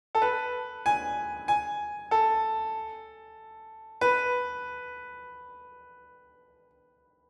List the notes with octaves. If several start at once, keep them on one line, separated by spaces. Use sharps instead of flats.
A4
B4
G#5
G#5
A4
B4